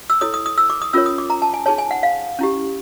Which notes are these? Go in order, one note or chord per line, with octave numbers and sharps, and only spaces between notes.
E6
E4 A4 C#5 D#6
D#6
D#6
E6
D6
D#6
C#4 F4 A#4 C#5 E6
D#6
D6
A#5
A5
G#5
D#4 G#4 C#5 A5
G#5
F#5
F5
C#4 E4 G4